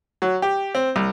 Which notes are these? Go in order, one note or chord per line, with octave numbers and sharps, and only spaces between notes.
F#3
G4
C4
C2